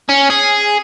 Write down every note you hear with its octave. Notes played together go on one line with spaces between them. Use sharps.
C#4
G#4